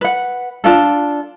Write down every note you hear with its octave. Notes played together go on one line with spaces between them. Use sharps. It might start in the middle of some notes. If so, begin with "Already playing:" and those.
B4 F#5
D4 F4 A4